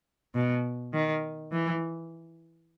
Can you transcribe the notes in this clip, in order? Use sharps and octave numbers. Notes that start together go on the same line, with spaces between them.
B2
D#3
E3